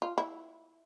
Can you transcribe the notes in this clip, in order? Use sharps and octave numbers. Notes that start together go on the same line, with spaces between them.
F4
E4